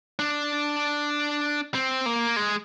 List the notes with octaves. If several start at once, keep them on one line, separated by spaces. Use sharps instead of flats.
D4
C4
A#3
G#3